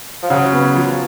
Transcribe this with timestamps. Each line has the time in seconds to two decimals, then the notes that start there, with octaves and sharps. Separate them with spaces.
0.23 F3
0.30 C#3 F#3
0.53 B3
0.75 F3